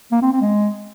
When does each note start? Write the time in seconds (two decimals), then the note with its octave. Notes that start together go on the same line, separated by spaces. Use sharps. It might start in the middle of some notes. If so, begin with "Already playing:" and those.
0.12 A#3
0.22 C4
0.32 C4
0.41 G#3